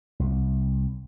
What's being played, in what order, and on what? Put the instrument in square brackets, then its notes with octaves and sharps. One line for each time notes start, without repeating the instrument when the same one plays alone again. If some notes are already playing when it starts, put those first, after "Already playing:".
[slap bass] C2